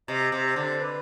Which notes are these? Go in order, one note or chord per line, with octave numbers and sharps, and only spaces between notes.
C3 D#5
C3
C5
D3
B4